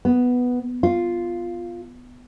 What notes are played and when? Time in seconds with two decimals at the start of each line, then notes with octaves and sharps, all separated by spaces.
0.05 B3
0.83 F4